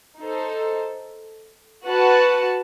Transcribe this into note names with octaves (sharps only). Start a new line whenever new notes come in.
D#4 A4 C5
F#4 B4 F#5 A5